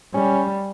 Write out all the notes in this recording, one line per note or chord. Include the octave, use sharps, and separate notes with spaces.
G3 C#4